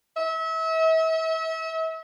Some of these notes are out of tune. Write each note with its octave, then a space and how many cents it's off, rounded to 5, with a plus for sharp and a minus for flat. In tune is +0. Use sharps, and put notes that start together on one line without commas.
E5 -35